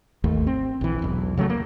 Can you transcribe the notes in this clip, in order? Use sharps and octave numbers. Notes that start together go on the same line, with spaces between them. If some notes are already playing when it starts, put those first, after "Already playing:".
G#1 D#2 A3
C4
A#1 E3
E1 B1
C#3 F#3 G#3 A3
A#3